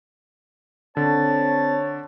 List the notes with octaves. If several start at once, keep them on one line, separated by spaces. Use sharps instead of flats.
D3 C4 C#5 A5